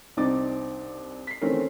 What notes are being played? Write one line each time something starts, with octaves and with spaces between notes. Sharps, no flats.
C2 C4 D4 D#4 D6 A6
B6 C7
D#3 E3 A3 C4 C#4 A#4